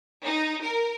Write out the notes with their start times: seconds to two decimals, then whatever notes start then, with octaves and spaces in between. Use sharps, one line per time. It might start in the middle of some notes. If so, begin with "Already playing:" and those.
0.24 D#4
0.63 A#4